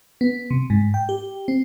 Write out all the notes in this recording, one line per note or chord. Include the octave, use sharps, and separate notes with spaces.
B3
C3
G#2
G5
G4
C4